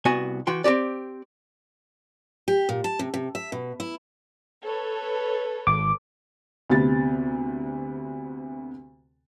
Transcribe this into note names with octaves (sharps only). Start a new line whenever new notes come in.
C2 B3 F#4 G#5
E3 F#4 G5 C6
C4 F#4 G4 D5
G4
A#2
A5
C3
C3
E5
B2
E4
A4 B4 C#5
G#1 D6
D2 C3 B3 A6